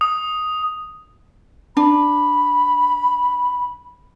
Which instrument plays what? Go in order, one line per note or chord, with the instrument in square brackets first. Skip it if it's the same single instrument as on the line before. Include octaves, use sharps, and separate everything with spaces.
[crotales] D#6
[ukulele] D4 [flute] B5